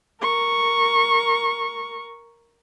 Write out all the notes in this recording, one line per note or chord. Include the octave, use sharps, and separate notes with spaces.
A#4 C#6